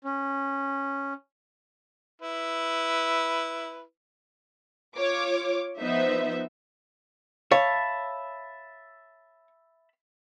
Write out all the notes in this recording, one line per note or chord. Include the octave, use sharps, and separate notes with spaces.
C#4
E4 B4
F4 C#5 D6
F3 B3 D#4 C5 E5
C#5 E5 F5 A5 B5